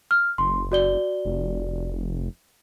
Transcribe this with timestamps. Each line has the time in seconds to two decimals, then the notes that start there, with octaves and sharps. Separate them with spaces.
0.11 F6
0.38 F#1 C6
0.72 F#4 D5 G7
1.25 F1